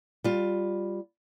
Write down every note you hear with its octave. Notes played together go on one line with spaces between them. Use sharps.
G3 F4